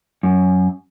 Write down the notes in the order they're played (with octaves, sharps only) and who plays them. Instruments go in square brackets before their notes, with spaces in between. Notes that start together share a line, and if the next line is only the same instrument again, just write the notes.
[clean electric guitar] F#2